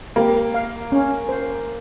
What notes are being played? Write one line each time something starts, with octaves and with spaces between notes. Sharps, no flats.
A#3 G4
F5
C#4
C5